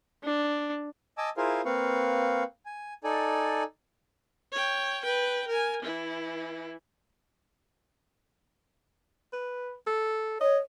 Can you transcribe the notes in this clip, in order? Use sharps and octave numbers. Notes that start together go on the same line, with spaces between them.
D4
D#5 G#5 A5 D6 E6
E4 F4 G#4 A#4 C5 F5
A#3 C4 B4 F5 C#6
G#5
D#4 A4 D5 G#5
C#5 G5
B4 G5
A#4 G#5
E3 E4
B4
A4
C#5 D#5